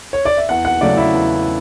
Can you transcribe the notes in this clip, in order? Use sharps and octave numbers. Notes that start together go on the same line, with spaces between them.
C#5
D5
E5
E2 F#5
F#5
C#3 F#3 A3 D5
E4
E2